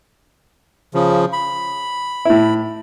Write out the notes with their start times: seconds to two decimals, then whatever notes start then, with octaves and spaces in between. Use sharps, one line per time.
0.94 C#3 F3
1.33 B5
2.25 A2 E4